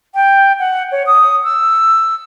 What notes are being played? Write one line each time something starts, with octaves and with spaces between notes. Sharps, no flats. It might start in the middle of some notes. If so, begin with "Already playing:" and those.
G5
F#5
C#5
D#6
E6